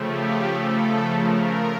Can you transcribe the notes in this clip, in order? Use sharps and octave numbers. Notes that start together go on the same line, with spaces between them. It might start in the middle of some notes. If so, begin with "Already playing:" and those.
Already playing: C#3 F3 A3 G4
A4
A#4